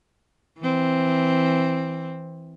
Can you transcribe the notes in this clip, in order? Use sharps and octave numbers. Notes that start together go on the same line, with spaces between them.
E3 C4